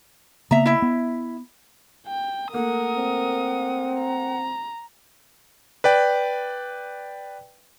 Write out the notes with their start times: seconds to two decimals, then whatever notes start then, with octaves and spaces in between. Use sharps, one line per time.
0.51 C#3 A#3 B3 E5 A#5
0.66 E4 E5
0.82 B3
2.07 G5
2.53 A3 A#3 A#4 F#5 D#6
2.97 C4
4.00 A#5
5.84 B4 D5 G5